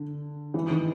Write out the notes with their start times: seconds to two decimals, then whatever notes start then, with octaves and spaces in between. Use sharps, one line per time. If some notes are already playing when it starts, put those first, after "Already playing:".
Already playing: D3
0.54 E3
0.70 D#3